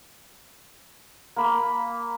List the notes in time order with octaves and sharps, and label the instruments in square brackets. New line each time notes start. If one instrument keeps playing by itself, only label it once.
[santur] A#3 B5